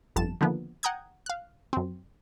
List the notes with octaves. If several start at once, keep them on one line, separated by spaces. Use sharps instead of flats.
G1 F2 A5 E7
D3 D#3 F3 A#3 B3
F#5 G5 A#5 D#6 G6 G#6
F5 F#6
F#2 C4